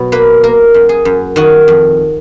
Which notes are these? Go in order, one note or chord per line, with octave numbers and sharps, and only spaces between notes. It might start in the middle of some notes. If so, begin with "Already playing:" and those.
Already playing: B2 F#3
A#3 B4
A#3 A#4
F#2
G#4
F#2
D#3 F#4
F2